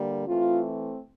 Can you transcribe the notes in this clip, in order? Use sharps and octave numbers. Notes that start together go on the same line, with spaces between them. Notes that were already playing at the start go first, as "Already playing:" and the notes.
Already playing: D3 G3 A#3
E3 A3 C4 F4